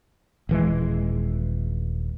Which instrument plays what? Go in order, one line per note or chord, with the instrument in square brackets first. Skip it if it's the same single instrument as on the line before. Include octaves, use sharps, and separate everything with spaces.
[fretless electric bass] D#1 E3 G#3